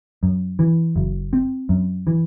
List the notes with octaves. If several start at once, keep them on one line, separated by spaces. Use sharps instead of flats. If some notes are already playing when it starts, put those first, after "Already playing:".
F#2
E3
F#1
C4
F#2
E3